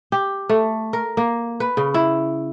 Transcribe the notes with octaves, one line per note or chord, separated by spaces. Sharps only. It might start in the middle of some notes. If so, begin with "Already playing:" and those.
G4
A3
A#4
A#3
B4
C#3
E4